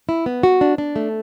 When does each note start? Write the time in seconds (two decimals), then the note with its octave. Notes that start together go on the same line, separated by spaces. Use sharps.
0.09 E4
0.26 B3
0.43 F#4
0.61 D4
0.78 D4
0.96 A3